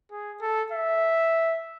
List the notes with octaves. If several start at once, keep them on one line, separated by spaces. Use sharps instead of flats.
G#4
A4
E5